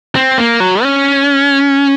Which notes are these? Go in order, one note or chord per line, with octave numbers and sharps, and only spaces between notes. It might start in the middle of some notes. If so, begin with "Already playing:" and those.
C4
A#3
F#3
C#4